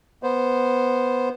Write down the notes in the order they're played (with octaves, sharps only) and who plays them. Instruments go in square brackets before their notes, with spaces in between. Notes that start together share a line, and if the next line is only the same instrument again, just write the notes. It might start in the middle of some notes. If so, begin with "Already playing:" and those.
[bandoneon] B3 C5